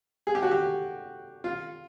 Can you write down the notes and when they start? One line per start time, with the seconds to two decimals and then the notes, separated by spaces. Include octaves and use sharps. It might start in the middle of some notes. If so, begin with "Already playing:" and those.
0.27 G#4
0.35 G4
0.43 F#4
0.51 G4
1.44 F4